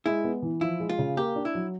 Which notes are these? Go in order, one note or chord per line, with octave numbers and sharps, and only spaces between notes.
G#3 E4
B3
E3
F3 E4
G#3
F4
C#3
A#3 G4
D4
E4
F#3